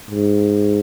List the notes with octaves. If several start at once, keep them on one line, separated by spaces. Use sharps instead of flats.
G#2